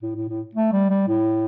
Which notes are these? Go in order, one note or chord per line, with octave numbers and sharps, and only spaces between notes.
A2
A2
A2
A3
G3
G3
A2